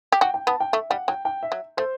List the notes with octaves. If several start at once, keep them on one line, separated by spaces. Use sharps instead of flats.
G4
F#4 G5
G5
B3 A5
G5
A3 E5
G3 F#5
F#3 G5
G5
E5
F#3
A3 C5